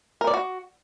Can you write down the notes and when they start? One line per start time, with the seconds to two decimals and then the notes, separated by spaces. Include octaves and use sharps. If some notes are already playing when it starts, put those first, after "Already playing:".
0.21 A#4
0.27 D5
0.34 F#4